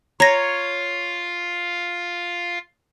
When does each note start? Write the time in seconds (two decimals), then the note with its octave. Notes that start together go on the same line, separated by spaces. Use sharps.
0.20 F4 C#5 F5 A#5 A#6